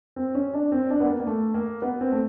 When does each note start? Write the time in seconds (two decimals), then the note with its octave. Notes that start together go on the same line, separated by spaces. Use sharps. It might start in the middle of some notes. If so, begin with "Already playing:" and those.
0.16 C4
0.35 C#4
0.54 D4
0.72 C4
0.90 D4
1.00 B3
1.09 A#3
1.20 A#3
1.27 A3
1.54 A#3
1.82 B3
2.01 C4
2.12 A3